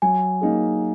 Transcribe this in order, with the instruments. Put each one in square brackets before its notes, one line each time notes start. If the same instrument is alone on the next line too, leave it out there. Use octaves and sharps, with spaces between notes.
[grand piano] F#3 [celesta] G#5
[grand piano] A#3 D#4 G#4